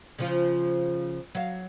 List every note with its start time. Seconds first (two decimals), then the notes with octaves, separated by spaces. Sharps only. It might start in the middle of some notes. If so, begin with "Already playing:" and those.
0.19 C#3 F3 F4
1.35 F#3 F5